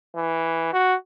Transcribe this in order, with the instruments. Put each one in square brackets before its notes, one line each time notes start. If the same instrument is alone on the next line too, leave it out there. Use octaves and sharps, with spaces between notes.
[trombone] E3
F#4